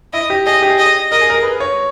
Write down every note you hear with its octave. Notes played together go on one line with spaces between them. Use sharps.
E4 D#5
G4
G#4 D#5
G4
G#4
D#5
A#4 D#5
G#4
A#4
B4
C#5